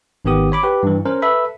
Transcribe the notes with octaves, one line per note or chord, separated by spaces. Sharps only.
G#1 D#3 B3 G4 D#6
C#5 B5 D6
G4 B4
G2 E3
C#4 A#4 C5
A4 B4 E5 B5